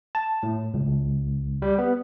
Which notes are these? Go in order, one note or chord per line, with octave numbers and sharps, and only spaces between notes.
A5
A2
C#2
G3
B3